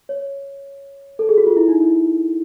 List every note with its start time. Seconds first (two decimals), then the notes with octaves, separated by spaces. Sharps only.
0.09 C#5
1.19 A4
1.29 G#4
1.38 F#4
1.47 F4
1.56 E4
1.68 D#4
1.81 E4